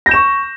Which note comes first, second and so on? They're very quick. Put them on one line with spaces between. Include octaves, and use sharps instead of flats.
A#6 G6 E7 C#6